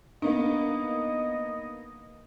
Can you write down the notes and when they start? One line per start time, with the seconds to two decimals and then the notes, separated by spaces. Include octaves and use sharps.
0.22 A#3 B3 D4 D#4 D#5